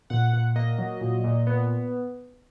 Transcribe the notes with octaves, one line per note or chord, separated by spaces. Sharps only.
A#2 F#5
A#2
A#3 D#5
F#3
A#2
A#2
B3